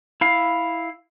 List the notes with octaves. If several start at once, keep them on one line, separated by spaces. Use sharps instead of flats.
E4 F5